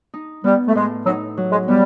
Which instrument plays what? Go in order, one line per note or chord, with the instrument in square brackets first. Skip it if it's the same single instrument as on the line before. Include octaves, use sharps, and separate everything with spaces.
[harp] D#4
[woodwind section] G3 [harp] B3
[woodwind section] A3
[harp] A2 [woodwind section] G#3
[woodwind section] F#3 [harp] D#4
[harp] F#3
[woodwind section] G#3
[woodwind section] G3 [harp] B3